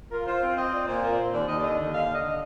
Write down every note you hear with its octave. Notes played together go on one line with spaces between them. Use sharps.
F4 A#4
F4 C5
C4
C4 D#5
F4 D5
A#2 C5
F4 A#4
D5
C4 C5
D#2 D5
D#2 D#5
D5
D3 D#5
D#2 D#5
D3 F5
D3
D#5
D#5